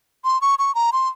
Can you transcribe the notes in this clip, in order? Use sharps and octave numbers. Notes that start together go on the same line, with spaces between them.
C6
C#6
C#6
A#5
C6